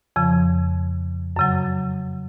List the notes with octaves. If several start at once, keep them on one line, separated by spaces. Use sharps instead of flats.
F2 C#3 F3
F#2 C#3 F#3